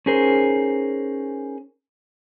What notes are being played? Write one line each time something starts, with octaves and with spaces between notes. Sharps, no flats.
C#4 D#4 G#4 A#4 C5